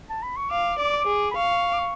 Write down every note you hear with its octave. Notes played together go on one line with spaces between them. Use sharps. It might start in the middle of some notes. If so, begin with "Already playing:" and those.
A5
B5
C#6
F5 D6
D5
D6
G#4
B5
F5 C#6
D6
C#6